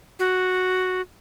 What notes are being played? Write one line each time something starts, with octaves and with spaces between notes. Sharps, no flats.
F#4